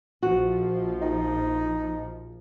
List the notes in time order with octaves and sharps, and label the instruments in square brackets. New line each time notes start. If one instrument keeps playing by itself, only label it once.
[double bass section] A#1 F3 [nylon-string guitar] F#4
[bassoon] D#4